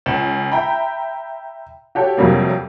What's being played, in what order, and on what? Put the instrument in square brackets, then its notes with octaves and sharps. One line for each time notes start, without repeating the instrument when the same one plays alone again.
[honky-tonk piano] C#2 E7
E5 G5 A#5 B5
F#4 G4 A4 C#5
F2 C3 F#3 G3 A#3